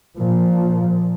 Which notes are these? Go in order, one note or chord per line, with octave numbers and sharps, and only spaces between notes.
A#2 F3